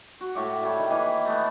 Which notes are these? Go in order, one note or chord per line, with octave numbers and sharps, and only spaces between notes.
F#4
A2 E5 C#6 D6
G3 A4 C#5
D#3
D#3 E3 A#3 G#5
A3 B3